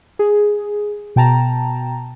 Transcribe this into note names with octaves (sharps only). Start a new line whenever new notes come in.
G#4
B2 G5 A5 A#5